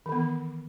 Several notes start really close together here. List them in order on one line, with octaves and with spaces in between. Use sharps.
E3 D#3 B3